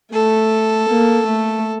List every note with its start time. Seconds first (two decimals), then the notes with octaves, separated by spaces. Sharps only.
0.13 A3 A4
0.88 A#3
1.26 A3